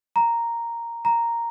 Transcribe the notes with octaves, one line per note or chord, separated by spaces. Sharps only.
A#5
A#5